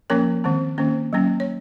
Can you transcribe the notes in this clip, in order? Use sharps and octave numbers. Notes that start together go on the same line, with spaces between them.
F3 A#3 C#4 A#4 C#5
D#3 G#3 C4
D#3 A#3 C#4
F#3 A#3 C#4
C#5